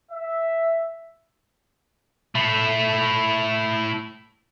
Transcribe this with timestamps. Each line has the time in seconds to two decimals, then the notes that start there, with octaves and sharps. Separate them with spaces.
0.11 E5
2.35 A3 E4